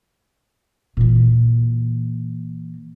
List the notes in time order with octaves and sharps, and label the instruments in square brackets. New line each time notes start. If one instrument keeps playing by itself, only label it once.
[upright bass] A#2 E3